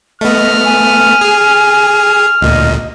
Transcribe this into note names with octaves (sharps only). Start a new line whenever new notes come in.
A3 B3 D#5 F6
G#5
G#4
D2 A#2 D#5